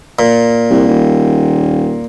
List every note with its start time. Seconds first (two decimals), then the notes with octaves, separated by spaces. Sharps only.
0.19 A#2
0.70 C2
0.88 D#1